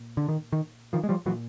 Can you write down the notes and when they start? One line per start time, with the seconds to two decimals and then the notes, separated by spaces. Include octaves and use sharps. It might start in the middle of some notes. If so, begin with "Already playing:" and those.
Already playing: A#2
0.17 D3
0.28 D#3
0.52 D#3
0.93 D#3 F3
1.03 G#3
1.09 F3 G3
1.26 A#2 E3 F#3